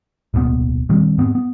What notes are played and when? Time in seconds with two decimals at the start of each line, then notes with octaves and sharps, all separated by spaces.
0.34 D1 B1 A#2 B3
0.89 A#2 D#3 G3 C4
1.18 G#2 B3 C4
1.35 B3